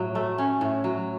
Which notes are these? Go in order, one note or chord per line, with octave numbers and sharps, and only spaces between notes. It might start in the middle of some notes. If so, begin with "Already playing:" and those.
Already playing: A2 F#3
A3
C#4
A2
F#3